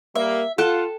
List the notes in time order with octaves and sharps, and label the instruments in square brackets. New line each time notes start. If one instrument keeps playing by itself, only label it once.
[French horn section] G3 A#3 [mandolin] E5
[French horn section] F4 [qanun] A4 G5 A5 [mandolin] F#5